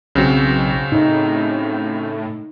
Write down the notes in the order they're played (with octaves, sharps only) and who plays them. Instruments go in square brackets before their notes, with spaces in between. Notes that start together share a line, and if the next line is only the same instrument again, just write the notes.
[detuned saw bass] B1 [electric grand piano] C#3 C4 F#4
[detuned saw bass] A2 [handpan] D#4